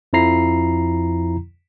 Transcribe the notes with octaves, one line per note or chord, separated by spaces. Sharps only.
F2 F3 E4 A#5 C7